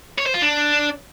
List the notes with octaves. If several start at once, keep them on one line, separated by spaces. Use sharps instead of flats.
C#5
C5
F4
D4